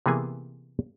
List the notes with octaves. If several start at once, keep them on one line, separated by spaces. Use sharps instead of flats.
C3 E3 A#3 B3 G#4 G#5